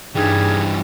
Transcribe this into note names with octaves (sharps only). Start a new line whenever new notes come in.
G2 E3 G3 D4 D#4 G#4 G5